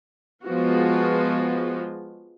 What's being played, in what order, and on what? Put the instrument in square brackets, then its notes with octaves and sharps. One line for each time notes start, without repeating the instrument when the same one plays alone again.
[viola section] F3 G#3 B3 F4 F#4